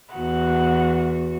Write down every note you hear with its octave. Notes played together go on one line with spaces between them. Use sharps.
E2 F#4 F#5